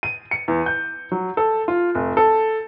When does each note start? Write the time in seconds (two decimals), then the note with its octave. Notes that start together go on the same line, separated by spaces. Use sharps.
0.03 D#7
0.31 C#7
0.48 E2
0.66 G6
1.12 F#3
1.37 A4
1.68 F4
1.95 F1
2.17 A4